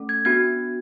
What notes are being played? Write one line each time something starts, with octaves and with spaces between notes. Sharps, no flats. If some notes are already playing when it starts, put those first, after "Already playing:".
Already playing: A3 C#4 A4
G#6
B3 D4 F#4 G#6